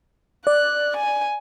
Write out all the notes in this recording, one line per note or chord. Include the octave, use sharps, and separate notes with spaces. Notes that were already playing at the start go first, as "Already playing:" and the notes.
D5 F#6
G#5